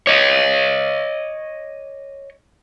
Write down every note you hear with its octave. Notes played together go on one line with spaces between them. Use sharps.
C#5 D#5